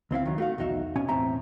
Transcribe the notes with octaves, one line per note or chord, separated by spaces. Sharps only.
C#2 C4 E4 F5
D#3 F#3
A3 F#4 F5
B1 E2 D#4 F#4 E5
B2 C#4 G#5
E2 A2 C4 E5 A#5